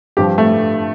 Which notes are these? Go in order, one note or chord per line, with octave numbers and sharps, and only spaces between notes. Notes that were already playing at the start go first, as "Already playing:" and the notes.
G2 F3 G4
A3